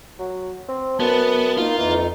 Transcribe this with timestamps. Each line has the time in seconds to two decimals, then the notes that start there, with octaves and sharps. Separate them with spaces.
0.19 F#3
0.68 C4
1.00 F#2 B3 B4 A5
1.57 A#3 D#4 F4
1.78 F2 E3 D#4